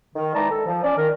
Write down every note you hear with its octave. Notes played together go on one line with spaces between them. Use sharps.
D#3
E3 G#3 D#4 D5 A5 A#5
A4
F3
C#4 D5
D#3 A#4